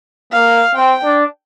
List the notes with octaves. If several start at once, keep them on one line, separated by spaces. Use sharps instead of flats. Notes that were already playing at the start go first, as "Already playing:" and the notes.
A#3 F5
C4 G5
D4